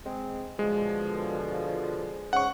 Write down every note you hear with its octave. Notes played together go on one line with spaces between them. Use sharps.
G#3 C4
B2 D3 F3 G#3
G#2 C#3 F#5 C#6